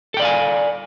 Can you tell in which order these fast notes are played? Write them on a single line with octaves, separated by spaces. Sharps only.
A4 G5 D5 F5 G#5